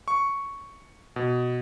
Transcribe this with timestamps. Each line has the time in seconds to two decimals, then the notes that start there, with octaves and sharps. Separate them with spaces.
0.08 C#6
1.16 B2